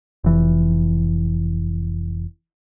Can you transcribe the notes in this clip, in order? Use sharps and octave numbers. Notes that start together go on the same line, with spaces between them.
F1 E3